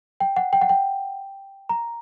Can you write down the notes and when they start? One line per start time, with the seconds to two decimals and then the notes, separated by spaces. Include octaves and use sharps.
0.20 G5
0.37 F#5
0.53 G5
0.61 F#5
0.69 G5
1.69 A#5